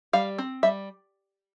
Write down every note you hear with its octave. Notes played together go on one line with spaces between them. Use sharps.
G3 F5
C4
G3 E5